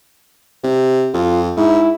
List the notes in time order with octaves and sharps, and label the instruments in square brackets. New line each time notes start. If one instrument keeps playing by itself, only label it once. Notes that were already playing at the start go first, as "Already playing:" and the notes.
[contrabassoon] C3
[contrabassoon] F2 [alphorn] F4
[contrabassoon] G#2 [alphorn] E4